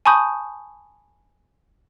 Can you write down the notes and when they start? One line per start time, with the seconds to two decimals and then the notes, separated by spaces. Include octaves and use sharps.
0.06 G#5 A5 B5 C#6 D#6 G6